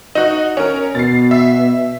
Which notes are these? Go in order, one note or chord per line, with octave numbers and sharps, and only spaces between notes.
D#4 F#4
C#4 A#4
B2 A6 C7
E5